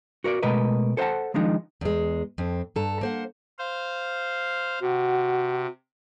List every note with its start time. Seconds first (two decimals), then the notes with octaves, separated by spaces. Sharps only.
0.24 F#4 A#4 C#5 D5
0.43 B2 G#3 A3 A#4 B4 D#5
0.97 A4 C5 E5 F#5 A5
1.34 D#3 F3 G#3 D4 D#4
1.81 E2 G#3
2.38 F2 C4
2.76 G2 A4 A#5
3.01 A#3 C5 F#5
3.59 C5 F5
4.81 C3 F#4